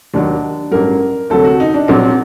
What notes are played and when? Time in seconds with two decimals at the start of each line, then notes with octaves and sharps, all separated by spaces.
0.14 D#2 D#3 F#3 D4
0.71 A1 G2 F#3 A#4
1.30 D2 C3 F#3 A4
1.44 F#4
1.60 D#4
1.74 D4
1.88 A#1 A#2 F#3 C4